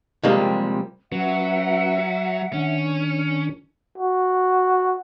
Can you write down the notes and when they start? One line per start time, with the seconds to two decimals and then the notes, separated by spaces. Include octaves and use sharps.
0.23 C3 F3 G3 G#3 A#3 C4
1.12 F#3 C#4 F#4 B4 E5 F#5
2.53 D#3 C#4 D4
3.98 F#4